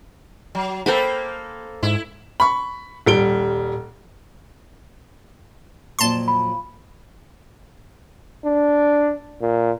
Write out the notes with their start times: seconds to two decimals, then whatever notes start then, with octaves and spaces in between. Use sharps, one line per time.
0.55 F#3
0.86 A#3 A4 C5 G5 B5
1.83 G#2 E4
2.40 B5 C#6
3.06 D#1 G3 D7 G7
5.99 F2 A#2 F#3 A5 C6
6.28 B5
8.44 D4
9.41 A#2